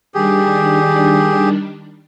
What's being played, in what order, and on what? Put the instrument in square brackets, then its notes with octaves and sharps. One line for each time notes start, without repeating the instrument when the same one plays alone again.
[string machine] D#3 G3 D4 [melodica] G4 G#4